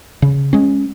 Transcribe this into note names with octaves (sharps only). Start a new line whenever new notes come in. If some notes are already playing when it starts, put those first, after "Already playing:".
C#3
G#3 C#4